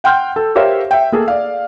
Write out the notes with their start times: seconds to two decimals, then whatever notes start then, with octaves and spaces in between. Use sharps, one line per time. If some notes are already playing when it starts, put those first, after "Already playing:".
0.04 F#5 G5 C6 F6 G6
0.36 A4
0.55 G4 A#4 C5 C#5 E5 F5
0.91 E5 G5
1.12 A#3 G#4 A4
1.28 D5 F5